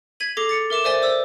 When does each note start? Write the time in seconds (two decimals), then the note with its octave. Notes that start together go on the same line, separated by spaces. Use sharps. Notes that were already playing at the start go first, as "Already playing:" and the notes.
0.20 G#6 B6 D#7 F#7
0.37 G#4 A4 D6 A#6 C7 G7
0.49 A6 C#7
0.70 A#4 E5 D6 E7
0.84 C5 D5 E5 G#5 A6 G7
1.02 C5 D5 E6